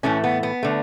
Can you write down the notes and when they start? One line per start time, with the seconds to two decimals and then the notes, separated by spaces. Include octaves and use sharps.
0.03 A2 E3 A3 C#4
0.24 B3
0.43 B3
0.63 D3 A3